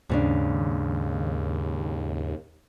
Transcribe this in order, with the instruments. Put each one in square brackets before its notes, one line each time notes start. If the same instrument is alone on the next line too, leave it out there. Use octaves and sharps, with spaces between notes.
[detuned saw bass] D#2 [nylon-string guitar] G#2 C#3 D4